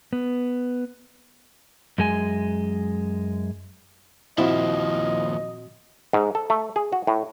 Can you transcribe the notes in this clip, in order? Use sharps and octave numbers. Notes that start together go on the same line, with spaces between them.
B3
F#2 G#3 G#5
D#2 A#2 F3 C4 E4 F#4 D#5
G#2
A4
A3
G#4
F#4
A2